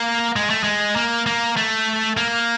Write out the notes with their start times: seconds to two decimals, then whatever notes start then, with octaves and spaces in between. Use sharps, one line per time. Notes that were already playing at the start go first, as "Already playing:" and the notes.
Already playing: A#3
0.36 G#3
0.50 A3
0.64 G#3
0.96 A#3
1.26 A#3
1.57 A3
2.17 A#3